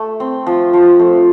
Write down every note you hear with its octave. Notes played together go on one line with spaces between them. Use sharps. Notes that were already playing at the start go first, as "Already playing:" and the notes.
Already playing: A3
C4
F3
F3
A3